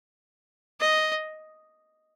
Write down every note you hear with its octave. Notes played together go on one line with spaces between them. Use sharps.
D#5